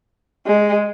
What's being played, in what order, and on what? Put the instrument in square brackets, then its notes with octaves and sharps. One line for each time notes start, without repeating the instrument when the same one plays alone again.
[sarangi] G#3